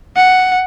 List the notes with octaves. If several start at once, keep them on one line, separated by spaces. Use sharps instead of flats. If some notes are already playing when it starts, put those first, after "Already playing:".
F#5